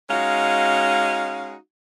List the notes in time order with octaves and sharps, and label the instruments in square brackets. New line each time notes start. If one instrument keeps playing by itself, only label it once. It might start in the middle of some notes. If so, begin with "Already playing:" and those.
[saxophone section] G#3 C#4 D#4 F#4 F5